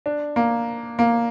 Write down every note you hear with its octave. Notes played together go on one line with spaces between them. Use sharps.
D4
A#3
A#3